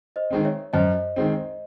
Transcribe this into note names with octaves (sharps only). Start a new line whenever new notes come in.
C5 D#5
D#3 G#3 C4
C#5 E5
F#2 C5 D#5
D#3 G#3 C4